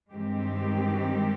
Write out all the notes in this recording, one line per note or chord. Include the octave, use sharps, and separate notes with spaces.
G2 D#3 G#3 C4 G4